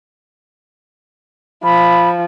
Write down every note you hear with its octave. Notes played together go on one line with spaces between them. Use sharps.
F3 B5